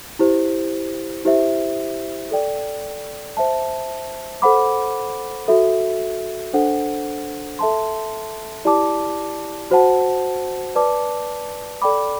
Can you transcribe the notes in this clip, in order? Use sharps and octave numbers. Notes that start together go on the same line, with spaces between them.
E4 G4 C5
E4 G4 C5 E5
A4 D5 G5
C5 E5 A5
A4 C5 F#5 B5 D6
F#4 A4 E5
D4 A4 C5 F#5
A4 E5 A5 C6
E4 G4 D5 A5 D6
F#4 C5 F#5 A5
B4 D5 A5 D6
A4 D5 G5 B5 D6